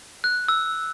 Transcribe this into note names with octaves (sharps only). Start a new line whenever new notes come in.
F#6
E6